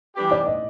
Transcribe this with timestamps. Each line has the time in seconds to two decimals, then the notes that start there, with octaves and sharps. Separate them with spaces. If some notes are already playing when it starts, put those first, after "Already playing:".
0.16 E3 G3 B3 D4 G4
0.31 D5
0.46 D#5